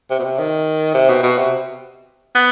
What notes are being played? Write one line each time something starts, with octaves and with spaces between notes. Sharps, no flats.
C3
B2
C3
D#3
C3
B2
B2
C3
B3